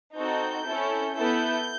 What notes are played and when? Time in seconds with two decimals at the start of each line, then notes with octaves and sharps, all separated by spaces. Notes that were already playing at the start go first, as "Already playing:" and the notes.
0.18 C4 D#4 F#4 A4 G6
0.66 C#4 E4 A4
1.15 B3 E4 A4 G6